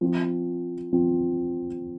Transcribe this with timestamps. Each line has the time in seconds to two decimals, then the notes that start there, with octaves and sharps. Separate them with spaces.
0.01 F3 C4 F4
0.93 F3 C4 F4